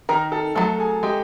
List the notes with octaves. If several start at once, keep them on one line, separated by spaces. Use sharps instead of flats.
D#3 A#4 A#5
A4 A5
F#3 A3 A4 A5
G#4 G#5
G#3 G4 G5